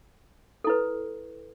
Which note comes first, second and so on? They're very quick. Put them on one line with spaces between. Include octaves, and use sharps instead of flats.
A4 E4 B4